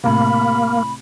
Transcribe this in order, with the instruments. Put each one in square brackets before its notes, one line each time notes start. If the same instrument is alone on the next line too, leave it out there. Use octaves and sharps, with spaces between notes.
[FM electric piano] A2 C3 [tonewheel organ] A#3 [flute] B5